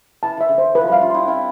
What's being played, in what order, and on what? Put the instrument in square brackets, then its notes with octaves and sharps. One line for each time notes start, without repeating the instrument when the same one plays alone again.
[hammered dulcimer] E3 [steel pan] A5
[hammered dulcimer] E3 [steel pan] E5
[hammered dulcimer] D3
[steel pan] C5
[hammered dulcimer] E3 [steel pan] B4
[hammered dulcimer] F3
[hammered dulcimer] G3 [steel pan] F5
[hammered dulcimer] D4 F4
[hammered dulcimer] E4 G4 [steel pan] C6
[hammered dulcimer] D4
[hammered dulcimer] C4 E4 [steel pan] F5